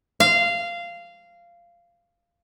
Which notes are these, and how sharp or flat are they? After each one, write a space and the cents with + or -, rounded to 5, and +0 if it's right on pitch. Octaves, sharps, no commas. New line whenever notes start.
F5 -15